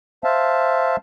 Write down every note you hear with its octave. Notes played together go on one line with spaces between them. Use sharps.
C5 E5 F5 A5